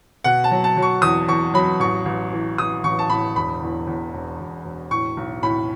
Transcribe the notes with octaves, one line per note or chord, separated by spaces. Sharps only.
B2 F#5
A5
F#3
A5
F#3
C#6
E2 D#6
E2 C#6
F#3 B5
A1 C#6
A1
E3
E3 D#6
A1 C#6
A5
A2 B5
E1 B5
E2
E2
E1
E1
E1
A2 C#6
B1
A2 B5